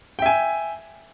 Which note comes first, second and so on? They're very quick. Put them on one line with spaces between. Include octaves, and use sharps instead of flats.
G5 E5 G#5